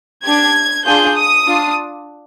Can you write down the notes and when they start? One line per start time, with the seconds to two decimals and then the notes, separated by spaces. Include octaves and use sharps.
0.24 D4 G4 G#6
0.85 D4 F4 G#4 G6
1.15 D#6
1.47 D4 F4